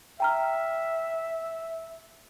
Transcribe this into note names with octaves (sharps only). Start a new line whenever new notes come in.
E5 G5 A#5 F6